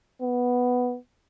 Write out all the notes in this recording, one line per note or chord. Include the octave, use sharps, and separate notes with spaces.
B3